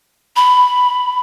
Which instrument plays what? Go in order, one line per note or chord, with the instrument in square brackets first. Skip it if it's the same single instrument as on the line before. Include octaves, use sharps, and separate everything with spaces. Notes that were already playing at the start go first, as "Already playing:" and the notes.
[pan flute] B5